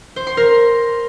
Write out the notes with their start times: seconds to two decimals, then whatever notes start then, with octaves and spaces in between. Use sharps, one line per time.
0.16 C5
0.27 C6
0.37 A#4